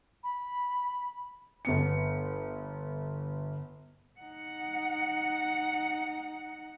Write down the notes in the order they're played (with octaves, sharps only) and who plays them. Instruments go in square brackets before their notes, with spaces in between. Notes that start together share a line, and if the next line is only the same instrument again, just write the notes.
[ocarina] B5
[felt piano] G1 B3 C#7
[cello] D#4 F#5